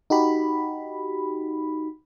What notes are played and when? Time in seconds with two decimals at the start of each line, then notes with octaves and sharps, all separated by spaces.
0.10 D#4 F#4 G4 B5